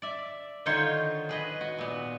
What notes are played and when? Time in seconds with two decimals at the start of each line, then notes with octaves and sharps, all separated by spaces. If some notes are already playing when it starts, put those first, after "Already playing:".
0.02 D5 E5
0.66 D3 D#3 D#4 F4 C5 C#5
1.29 G#4 B4 D#5
1.61 F#4
1.78 A#2 B3